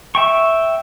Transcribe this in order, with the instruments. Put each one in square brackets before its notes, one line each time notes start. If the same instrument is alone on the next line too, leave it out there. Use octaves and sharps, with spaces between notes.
[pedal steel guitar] E5 G5 C#6